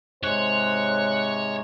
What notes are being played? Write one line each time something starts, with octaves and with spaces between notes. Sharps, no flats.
G#2 C3 G#3 C5 C#5 F#6